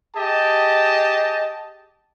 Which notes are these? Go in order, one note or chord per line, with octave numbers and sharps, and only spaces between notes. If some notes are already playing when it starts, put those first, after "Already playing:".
G4 G#4 D#5 A5